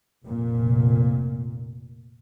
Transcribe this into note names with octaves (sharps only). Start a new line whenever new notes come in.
F1 A#2